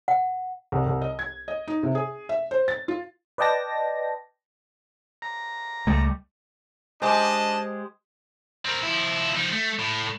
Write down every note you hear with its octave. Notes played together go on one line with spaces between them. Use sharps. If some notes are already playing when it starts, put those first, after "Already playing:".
F#5
C2
C2
D#5
G#6
D#5
D#4
C3
G#4
E5
C5
A6
F4
B4 D5 D#5 G5 A5 A#6
A#5
C#2 G3 A3
G#3 D4 G4 C5 D#5 A5
C4 A#4
F3 E4
F3 D#4
A3
A2